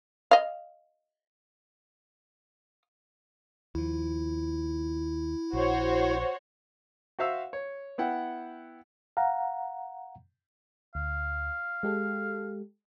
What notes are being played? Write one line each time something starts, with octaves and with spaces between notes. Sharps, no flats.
D#5 F5
D#2 F3 E4
A#1 F#4 C5 C#5
F#4 C5 E5 F5 E6
C#5
B3 E4 F#5 G5
F5 F#5 A#5
D2 F5
G#3 G4 A4